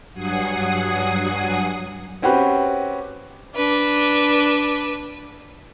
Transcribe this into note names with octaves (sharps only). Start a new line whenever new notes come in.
G2 F#3 F#5 G#5 D#6 C7
C4 C#4 F#4 G4 B4
D4 B4